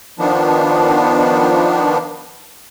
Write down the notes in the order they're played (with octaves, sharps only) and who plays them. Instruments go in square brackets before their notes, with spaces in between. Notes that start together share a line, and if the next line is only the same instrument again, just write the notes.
[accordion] D#3 F3 B3 D4